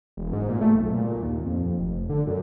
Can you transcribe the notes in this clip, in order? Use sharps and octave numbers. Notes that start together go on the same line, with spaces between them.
E1
G#2
A#2
A3
B1
A#2
D#2
F2
F1
D3
F#2